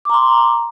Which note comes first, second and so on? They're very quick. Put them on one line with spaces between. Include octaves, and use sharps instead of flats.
D6 A#5 C6